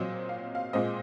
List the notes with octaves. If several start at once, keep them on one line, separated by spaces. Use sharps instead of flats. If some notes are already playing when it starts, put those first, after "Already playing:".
Already playing: A#2 F#3 C4 D#5
F5
F5
A#2 G#3 C4 D#5